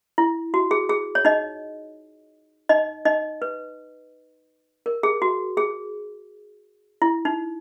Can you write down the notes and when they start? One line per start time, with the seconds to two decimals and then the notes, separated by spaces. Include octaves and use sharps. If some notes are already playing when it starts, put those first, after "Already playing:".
0.18 E4
0.54 F#4
0.71 G#4
0.89 G#4
1.15 C#5
1.25 D#4 D#5
2.69 D#4 D#5
3.05 D#4 D#5
3.42 B4
4.86 A#4
5.03 G#4
5.22 F#4
5.57 G#4
7.02 E4
7.25 D#4